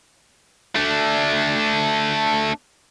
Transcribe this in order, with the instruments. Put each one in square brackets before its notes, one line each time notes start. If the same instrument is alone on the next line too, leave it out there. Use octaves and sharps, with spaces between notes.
[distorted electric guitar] A3 D4